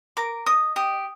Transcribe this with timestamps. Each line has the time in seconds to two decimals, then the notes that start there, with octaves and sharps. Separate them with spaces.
0.17 A#4 D6
0.46 D#5 D#6
0.76 G4 D#6